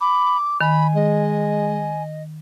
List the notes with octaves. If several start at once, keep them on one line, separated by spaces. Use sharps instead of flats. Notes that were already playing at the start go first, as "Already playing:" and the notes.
B5 D6
D#3 G#5 B5
G#3 D#5